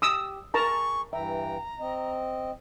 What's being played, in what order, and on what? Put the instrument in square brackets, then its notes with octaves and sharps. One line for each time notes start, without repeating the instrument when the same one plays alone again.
[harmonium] G4 [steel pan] D#6 E6
[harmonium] G#4 [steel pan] A#4 A5 A#5 [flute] C#6
[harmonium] G2 E3 G5 [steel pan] E5 [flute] A#5
[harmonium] C4 D#5